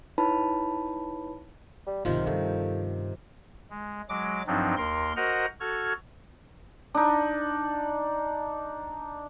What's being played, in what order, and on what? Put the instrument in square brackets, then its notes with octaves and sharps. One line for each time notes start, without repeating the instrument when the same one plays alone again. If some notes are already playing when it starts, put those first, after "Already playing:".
[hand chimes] D#4 E4 B4 C#5 A5 B5
[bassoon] G3
[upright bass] B1 G#2 [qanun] C3 D#3 F3 [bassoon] F4
[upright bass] G2 [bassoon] A3
[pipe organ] G#3
F#3 G#3 D6
G2 F3 F#3 C4 D4 D#4
D#2 A#4 C6
F#4 A#4 C5 D#5 F#5 A#5
F#4 A4 F6 G#6
[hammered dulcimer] D4 D#4